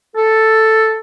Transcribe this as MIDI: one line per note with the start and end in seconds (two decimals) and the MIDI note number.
0.16 0.98 69